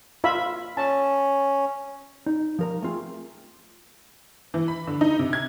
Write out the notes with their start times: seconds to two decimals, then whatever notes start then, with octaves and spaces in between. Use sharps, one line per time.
0.24 F4 E5 B5
0.77 C#4 A5
2.26 D#4
2.59 F3 A#4 A#5
2.83 A3 C4 F4 G#4
4.54 E3
4.68 B5
4.87 D3
5.01 D#4
5.19 C3
5.33 G#6